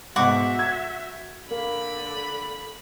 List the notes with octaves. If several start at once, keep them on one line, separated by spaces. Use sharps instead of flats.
G#2 B2 G#3 F#4 E5 F#5 C#6 D6
G#6
D3 A#3 B5